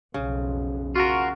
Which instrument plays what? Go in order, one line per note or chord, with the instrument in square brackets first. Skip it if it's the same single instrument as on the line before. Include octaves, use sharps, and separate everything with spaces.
[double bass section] B1 F2 [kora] C#3
[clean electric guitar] F4 A#4 [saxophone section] F#4